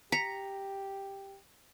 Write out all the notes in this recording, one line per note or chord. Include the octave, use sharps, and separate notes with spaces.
G4 A#5 B6 C#7